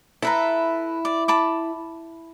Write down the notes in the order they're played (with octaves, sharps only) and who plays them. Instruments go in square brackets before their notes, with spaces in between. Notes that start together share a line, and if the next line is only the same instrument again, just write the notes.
[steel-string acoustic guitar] E4 [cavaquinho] A4 B4 A#5
[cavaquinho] D5
A5 B5 D6